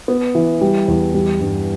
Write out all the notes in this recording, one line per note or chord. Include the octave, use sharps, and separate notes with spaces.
B3
E3
G3
E2
G3
G2